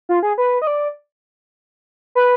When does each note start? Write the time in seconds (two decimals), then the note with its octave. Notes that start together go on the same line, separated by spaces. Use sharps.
0.09 F4
0.23 G#4
0.38 B4
0.62 D#5
0.67 D5
2.15 B4